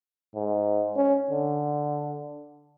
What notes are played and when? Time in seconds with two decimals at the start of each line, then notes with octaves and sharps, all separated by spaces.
0.35 G#2
0.96 C#4
1.30 D3